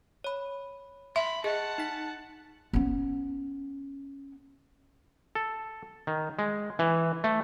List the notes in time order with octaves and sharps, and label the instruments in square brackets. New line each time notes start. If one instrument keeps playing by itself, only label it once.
[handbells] C#5 B5
[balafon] E5 [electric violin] B5 [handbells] C6
[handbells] G#4 [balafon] D#5 [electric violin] F#5 A5
[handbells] D#4 B6
[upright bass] B3 C#4
[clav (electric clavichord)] A4
D#3
G#3
E3
A3